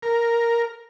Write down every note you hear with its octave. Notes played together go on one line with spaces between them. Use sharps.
A#4